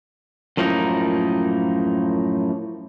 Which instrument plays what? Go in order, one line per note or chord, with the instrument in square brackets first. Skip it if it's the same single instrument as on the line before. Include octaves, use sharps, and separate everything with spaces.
[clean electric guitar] F#2 A2 F3 A#3 D#4